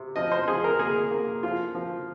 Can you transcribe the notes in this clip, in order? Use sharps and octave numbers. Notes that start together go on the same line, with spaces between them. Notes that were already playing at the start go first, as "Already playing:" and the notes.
Already playing: C3
F3 D#5
C5
F3 G#4
A#4
A#3 G#4
A#3
F3 F4
F3